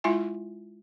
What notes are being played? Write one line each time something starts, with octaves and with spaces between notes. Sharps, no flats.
G#3 E4 F4 E5 G#5